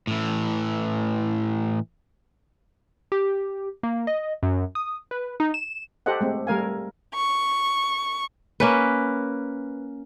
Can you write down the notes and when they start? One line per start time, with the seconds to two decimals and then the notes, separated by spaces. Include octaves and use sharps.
0.07 A2 E3
3.12 G4
3.83 A#3
4.07 D#5
4.43 F#2
4.75 D#6
5.11 B4
5.40 D#4
5.54 E7
6.06 G4 A4 C5 D#5 F#5
6.21 G#3 A3 C4
6.47 G3 A3 A#4 F5 G#5
7.15 C#6
8.60 A#3 C#4 B4